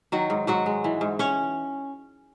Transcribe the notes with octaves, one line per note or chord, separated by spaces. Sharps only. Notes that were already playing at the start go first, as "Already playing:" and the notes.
D#3 F#3 F#4
G#2
G#2 F#3 F#4
G#3
E3
G#2
C#4 C#5